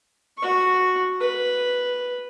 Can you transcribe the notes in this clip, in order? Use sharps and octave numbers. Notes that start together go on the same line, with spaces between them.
F#4 C#6
B4